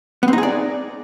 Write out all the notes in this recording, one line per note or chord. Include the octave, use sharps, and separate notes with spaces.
B3
C4
D#4
G#4
D5